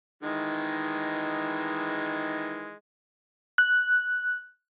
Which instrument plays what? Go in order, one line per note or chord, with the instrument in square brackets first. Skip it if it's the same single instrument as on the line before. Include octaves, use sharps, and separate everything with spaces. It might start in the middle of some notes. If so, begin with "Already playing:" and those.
[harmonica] D#3 E3 G#3
[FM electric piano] F#6